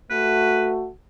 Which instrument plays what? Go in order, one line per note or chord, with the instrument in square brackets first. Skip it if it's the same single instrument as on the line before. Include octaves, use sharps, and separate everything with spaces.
[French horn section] A3 F#4 [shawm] B4